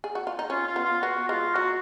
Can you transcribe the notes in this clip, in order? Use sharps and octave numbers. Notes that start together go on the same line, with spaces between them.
G#4
F#4
F4
D#4
C#4 F4
F4
B3
F4
B3 F#4
G#3 F4
F#3 F#4